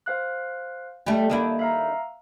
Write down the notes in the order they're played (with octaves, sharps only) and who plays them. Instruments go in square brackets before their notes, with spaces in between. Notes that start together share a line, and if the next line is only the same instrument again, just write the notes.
[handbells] C5 F5 F#6
[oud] G3 A3
[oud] D#3 D4 E4 [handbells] A#3
[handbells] E5 F5 A#5